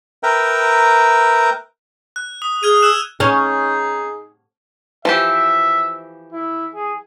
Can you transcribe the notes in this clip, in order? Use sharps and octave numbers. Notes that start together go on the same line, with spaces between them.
A#4 B4 E5 G5 A#5
F#6
D#6
G#4 F6 G#6 D#7
E6 F#6 E7
C#4 D#4 G#4
E3 F3 G4 E5
E4
G#4